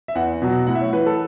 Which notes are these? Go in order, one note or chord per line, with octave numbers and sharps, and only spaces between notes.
E5
E2 F#5
B2 F#3
A2 F#5
E5
C#5
E3 B4
A4